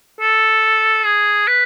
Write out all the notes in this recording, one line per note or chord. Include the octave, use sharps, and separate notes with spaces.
A4
G#4
B4